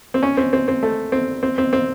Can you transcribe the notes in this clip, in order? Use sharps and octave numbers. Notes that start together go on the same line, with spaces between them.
C4
C#4
C4
C4
C4
A3
C4
C4
C4
C4